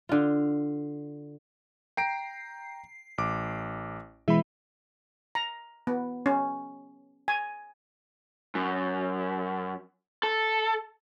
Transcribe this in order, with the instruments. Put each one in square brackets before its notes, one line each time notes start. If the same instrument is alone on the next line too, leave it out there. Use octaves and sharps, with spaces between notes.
[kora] D3 F4
[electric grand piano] G5 A#5 D7 [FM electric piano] C7
[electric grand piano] A1 D6
[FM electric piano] B2 E3 G#3 [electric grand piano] E5 B5
[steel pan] A#5
B3
C#4
G#5
[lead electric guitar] F#2
A4